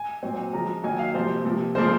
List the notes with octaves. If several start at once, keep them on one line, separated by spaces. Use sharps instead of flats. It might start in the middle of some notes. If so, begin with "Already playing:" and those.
Already playing: G#5
A#2 F#3 C4
C#3 F3 G#3 A#5
D#3 F#3 A#3 G#5
F5
C3 F3 A#3 C5
C3 F3 A#3
C#3 F3 A#3 C5